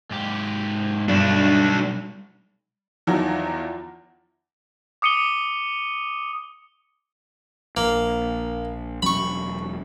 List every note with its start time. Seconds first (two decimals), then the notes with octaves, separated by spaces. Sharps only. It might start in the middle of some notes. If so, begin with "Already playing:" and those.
0.11 G#2 G4
1.09 B1 G2 D4 F#4
3.07 E2 D#3 F3 F#3
5.02 D6 D#6 C#7 D#7 G7
7.77 A#1 A#3
9.02 E1 F#3 C#4 B5 C#6